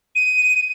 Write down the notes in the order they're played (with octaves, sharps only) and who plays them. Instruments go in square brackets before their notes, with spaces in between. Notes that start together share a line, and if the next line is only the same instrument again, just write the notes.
[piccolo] D#7